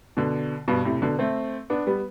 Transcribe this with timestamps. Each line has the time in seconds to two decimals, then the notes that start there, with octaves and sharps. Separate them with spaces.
0.17 B2 D3
0.68 G2 B2
0.85 A2 C3
1.02 B2 D3
1.19 A3 C4
1.70 B3 D4
1.87 G3 B3